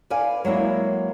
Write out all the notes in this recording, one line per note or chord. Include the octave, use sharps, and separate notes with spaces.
B4 D5 F5 G#5
F#3 G#3 A#3 E4